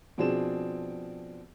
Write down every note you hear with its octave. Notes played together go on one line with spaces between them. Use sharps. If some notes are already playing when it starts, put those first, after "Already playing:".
B2 F3 C4 D4 G#4 E7